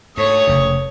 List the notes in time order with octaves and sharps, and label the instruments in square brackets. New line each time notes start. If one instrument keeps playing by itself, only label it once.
[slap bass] G#2 [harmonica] A3 D#6 [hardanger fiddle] C#5
[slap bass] F1 C#3